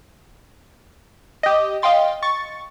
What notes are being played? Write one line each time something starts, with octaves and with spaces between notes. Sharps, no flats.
G4 D#5
D#5 F5 G5 C6 A6
C#6 A6